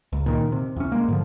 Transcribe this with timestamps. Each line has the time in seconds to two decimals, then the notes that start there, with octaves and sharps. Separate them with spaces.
0.13 C#2
0.26 A#2 D#3
0.52 C3
0.76 E2 C#4
0.92 G#3 A#3
1.08 G#2 D3 F3